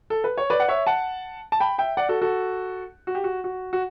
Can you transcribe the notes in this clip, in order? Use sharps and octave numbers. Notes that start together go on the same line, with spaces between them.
A4
B4
C#5
B4 D5
F#5
C#5 E5
F#5 A5
A5
G5 B5
E5 G5
D5 F#5
F#4 A4
F#4 A4
F#4
G4
F#4
F#4
F#4